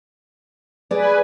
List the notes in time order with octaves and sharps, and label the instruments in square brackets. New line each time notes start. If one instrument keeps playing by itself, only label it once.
[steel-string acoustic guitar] G#4 D5 [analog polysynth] B4 G#5